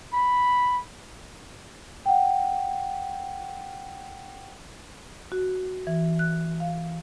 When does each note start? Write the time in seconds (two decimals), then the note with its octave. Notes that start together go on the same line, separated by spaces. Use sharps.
0.14 B5
2.06 F#5 G5
5.32 F#4
5.87 E3
6.19 F#6
6.60 F5